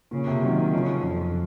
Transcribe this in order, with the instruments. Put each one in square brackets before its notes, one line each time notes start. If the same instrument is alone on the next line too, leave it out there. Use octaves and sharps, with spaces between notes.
[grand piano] A#2 [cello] C#3
[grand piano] C3
[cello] D#3 [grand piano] F#3
[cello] C#3 [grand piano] F3
[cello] F2